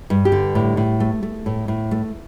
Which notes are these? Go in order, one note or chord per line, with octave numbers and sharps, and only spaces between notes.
G2
G4
D3
A2
A2
A3
A3
A2
A2
A3